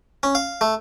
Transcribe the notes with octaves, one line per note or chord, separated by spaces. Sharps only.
C#4
F5
A3